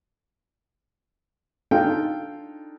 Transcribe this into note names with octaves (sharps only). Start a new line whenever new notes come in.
D4 D#4 F4 A4 F5 G5